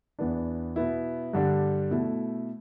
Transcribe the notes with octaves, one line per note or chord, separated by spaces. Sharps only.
E2 E3 B3 D4
B2 B3 E4
G2 D3 G3 D4
B2 A3 E4